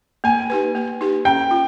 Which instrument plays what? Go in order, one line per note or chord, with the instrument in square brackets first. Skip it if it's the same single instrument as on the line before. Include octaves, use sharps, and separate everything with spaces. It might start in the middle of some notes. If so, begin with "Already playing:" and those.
[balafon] A#3 [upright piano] G#5
[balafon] D#4 G4 B4
A#3
D#4 G4 B4
[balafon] C#4 [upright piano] G5
[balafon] F4